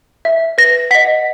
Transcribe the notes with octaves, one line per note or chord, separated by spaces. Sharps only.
E5
B4 A#6
D#5 F#5 B6